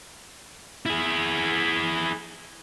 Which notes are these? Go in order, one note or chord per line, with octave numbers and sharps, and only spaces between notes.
E4 G#4